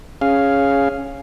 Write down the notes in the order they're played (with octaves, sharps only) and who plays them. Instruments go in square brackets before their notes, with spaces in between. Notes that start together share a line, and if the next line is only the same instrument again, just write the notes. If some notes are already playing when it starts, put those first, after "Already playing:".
[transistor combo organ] C#4 G#4 F5